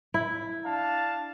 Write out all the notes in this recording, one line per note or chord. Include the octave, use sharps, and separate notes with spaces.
E4
D4 F5 A5